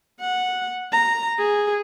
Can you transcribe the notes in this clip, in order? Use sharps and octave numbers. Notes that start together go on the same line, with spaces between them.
F#5
A#5
G#4